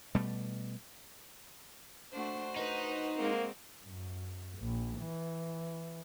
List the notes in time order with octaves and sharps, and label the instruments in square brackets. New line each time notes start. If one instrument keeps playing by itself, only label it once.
[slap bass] B2 G3 A3
[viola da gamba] A3 D4 [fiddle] F#4 C5
[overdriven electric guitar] D#4 [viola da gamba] B4
[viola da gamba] G#3 C4 [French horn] A#3
[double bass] F#2
A#1
E3